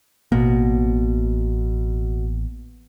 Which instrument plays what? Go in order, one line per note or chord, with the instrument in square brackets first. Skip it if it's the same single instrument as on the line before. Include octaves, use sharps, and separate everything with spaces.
[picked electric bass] A1 A#3 [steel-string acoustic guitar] B2